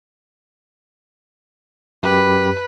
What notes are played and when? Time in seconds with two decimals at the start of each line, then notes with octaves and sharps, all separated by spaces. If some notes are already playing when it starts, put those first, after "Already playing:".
2.03 F#2 G4 B4 B5